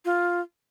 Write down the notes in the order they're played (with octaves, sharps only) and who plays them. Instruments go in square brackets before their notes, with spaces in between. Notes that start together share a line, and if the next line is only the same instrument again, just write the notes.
[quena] F4